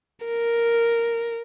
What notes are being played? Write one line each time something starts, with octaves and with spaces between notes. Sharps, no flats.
A#4